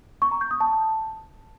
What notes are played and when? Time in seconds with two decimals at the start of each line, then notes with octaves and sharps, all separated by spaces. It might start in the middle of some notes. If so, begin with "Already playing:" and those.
0.22 C#6
0.31 A#5
0.41 G6
0.51 D#6
0.61 A5